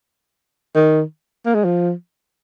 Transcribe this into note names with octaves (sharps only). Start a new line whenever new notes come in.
D#3
A#3
G#3
F3